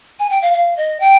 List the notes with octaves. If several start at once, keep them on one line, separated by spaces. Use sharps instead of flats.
G#5
G5
F5
F5
D#5
G5